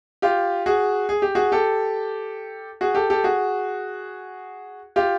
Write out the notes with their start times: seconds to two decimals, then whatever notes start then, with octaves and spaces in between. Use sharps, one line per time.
0.22 F4 G4
0.66 F#4 G#4
1.09 G#4
1.22 G4
1.35 F#4 G#4
1.52 G4 A4
2.81 F#4 G#4
2.95 G4 A4
3.10 G4 A4
3.24 F#4 G#4
4.96 F4 G4